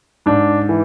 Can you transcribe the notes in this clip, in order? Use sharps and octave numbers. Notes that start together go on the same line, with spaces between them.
G#2 D4
E3